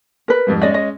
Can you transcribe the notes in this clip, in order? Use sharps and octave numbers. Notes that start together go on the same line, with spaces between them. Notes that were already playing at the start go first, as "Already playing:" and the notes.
A#4 B4
F2 G#2 G3
G#3 C#4 D5 D#5
D#5